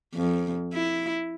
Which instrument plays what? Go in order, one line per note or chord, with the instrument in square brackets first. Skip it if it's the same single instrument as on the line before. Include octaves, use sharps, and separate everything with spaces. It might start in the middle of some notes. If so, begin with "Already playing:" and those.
[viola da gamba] F2
E4